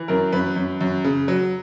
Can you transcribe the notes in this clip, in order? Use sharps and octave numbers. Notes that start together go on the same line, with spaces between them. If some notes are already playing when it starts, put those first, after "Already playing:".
Already playing: E3
F#2 A#4
F#2 B4
F#2
F#2
C#3
F#3